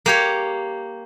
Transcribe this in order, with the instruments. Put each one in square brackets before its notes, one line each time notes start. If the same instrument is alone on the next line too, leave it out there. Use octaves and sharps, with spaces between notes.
[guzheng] A#3 G4 C#5